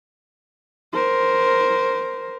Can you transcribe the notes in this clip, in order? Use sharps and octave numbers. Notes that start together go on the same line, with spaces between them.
A#4 C5